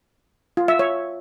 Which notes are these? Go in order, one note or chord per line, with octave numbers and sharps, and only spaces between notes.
F4
E5
C#5